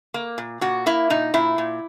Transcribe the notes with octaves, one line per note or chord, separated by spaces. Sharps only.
A#3
A#2
A#2 F#4
A#3 E4
A#2 D#4
A#2 E4
A#2